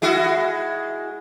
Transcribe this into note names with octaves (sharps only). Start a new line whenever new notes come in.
G#3 E4 F#4